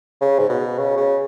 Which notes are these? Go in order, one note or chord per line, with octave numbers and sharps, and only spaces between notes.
C#3
G#2
B2
C#3
C#3